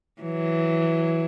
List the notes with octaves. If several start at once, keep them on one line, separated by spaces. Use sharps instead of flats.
E3 F#3